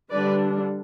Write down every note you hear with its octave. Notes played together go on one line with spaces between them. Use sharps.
D3 G3 D4 B4 D5